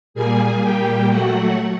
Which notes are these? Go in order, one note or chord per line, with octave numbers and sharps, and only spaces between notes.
A#2 G3 A#3 G#4 G#5
A#2 G3 A#3 G4 G5
F#3 A3 F#4 F#5